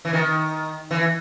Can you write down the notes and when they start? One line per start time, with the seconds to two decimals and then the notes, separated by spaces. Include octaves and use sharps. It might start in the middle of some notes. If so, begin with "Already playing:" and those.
0.05 E3
0.13 D#3
0.91 E3